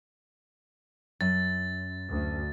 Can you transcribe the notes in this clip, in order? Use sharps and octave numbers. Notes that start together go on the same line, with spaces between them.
F#2 A6
D2